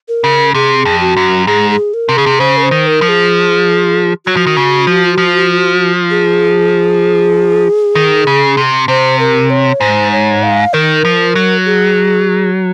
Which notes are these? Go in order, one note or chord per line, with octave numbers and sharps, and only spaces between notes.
A#4
C#3
C3 G#4
F2
F#4
F#2
G#2 G#4
G#4
A#4
C3
C#3 G#4
C3
C#3 C5
A#4
C5
D#3
A#4
F3
G#4
F#3 F#4
F3
D#3
C#3
F3
F3
G#4
D#3
C#3
C3
C3 C5
A#4
C#5
G#2 C5
C#5
F5
D#3 A#4
F3
F#3
G#4